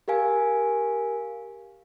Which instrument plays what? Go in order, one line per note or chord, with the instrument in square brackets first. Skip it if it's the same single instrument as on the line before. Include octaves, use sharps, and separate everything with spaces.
[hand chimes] G4 A#4 F5 G#5